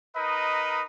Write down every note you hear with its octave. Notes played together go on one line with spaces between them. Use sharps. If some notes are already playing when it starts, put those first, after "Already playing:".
D#4 A#4 B4 D#5